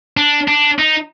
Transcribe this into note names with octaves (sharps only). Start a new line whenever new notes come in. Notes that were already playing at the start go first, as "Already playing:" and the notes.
D4
D4
D#4